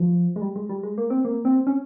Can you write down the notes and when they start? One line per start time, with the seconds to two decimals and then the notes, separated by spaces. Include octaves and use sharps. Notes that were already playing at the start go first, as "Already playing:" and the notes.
Already playing: F3
0.36 G#3
0.41 G3
0.56 G#3
0.69 G3
0.83 G#3
0.98 A#3
1.10 C4
1.25 A#3
1.45 C4
1.67 C#4